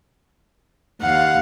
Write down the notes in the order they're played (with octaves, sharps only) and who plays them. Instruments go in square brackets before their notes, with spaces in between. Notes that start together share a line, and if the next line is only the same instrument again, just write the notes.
[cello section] D#2 F5 [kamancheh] F#5